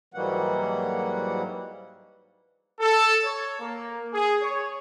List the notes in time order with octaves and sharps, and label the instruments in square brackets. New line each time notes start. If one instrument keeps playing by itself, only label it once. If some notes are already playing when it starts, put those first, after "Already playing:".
[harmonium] G#2 E3 F#3 G3 A#3 F#5
[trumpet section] A4
C#5
A#3
G#4
C#5